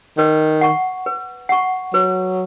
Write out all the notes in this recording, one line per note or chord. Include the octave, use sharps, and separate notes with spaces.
D#3 B4
F#5 C#6
B4
F#5 C#6
F#3 B4